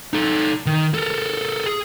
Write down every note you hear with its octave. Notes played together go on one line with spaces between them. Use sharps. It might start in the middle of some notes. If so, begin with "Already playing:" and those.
D#4 A4
D#3
A4 A#4
G#4